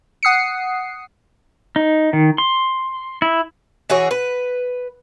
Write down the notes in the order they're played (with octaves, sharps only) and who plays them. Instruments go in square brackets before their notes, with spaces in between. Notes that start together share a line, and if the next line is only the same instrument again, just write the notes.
[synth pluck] F#5 D#6 C7 C#7
[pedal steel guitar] D#4
D#3
C6
E4
[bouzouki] E3 F#4 G#4 C#5
B4